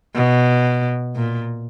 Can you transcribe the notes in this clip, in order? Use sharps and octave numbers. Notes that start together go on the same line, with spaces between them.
B2
A#2